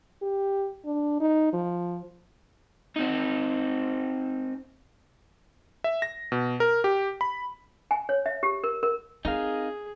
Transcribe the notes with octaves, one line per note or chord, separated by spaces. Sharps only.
G4
D4
D#4
F3
C4 D#4
E5
A#6
B2
A#4
G4
B5
G#5
C#5
E5
G4
A#4
A#4
C4 D#4 G#4 A#4 F5